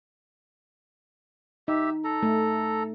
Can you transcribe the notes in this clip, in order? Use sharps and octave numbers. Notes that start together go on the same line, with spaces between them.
D#4 G4 E5
A4 A#5
A3